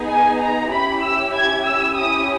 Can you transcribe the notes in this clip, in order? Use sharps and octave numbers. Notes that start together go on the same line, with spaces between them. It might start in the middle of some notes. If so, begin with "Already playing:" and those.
Already playing: B3 D#4 G#4
G#5
A#5
C#4 E4 G4 B5
E6
G#6
E6
C#4 E4 G4 D#6